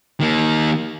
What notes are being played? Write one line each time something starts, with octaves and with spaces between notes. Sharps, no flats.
D#3 A#3